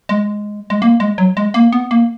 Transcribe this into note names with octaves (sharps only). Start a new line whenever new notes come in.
G#3
G#3
A#3
G#3
F#3
G#3
A#3
B3
A#3